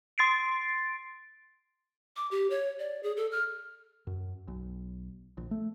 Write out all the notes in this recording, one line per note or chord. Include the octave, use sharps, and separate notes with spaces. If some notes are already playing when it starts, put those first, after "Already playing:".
C6 A6 C7 D7
D6
G4
C#5
D5
G#4
A4
F6
F#2
B1
A#1
A3